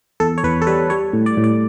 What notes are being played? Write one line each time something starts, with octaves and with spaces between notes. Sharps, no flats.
E2 A4
C#5
E2 B4
A4
G3 B4
G3 C#5
A2
D5
A2
D5